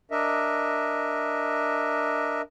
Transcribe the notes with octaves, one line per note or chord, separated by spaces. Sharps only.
D4 A#4 D#5 E5